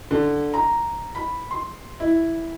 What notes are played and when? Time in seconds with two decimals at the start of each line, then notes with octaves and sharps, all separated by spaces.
0.11 D3
0.54 A#5
1.15 B5
1.51 C6
2.00 E4